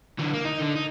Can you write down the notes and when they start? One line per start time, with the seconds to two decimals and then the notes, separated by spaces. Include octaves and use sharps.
0.19 D3 E3
0.34 A#3
0.45 D#4
0.60 D3
0.76 D#4